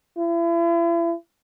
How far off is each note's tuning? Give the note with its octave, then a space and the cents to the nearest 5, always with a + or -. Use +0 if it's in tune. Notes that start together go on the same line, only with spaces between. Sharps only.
E4 +40